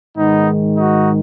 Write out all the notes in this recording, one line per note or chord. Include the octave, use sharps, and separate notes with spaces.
G#2 D#3 G#3 B3 D#4
D#4 F#4